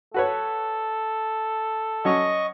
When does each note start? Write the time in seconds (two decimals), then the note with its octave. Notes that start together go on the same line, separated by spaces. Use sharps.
0.14 F#4 A4 B4 C#5
2.05 F#3 C#4 D#5 C#6